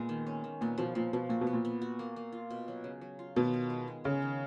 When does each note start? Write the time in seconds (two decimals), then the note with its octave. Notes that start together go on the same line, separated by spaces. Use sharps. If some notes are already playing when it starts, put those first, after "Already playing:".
Already playing: A#2 G#3 B3
0.09 D#3
0.27 C#4
0.44 D#3
0.61 A#2 B3
0.78 B2 F3
0.95 A#2 F3
1.13 B2 F3
1.29 A#2 F#4
1.41 B2
1.47 B3
1.53 A#2
1.65 B3
1.82 F#4
1.99 A#3
2.16 A#3
2.33 F4
2.50 B2
2.68 F#3
2.84 C#3
3.01 F#3
3.19 F4
3.36 B2 D#3
3.54 B3
3.70 G#3
3.88 G#3
4.04 C#3 C#4
4.22 D#3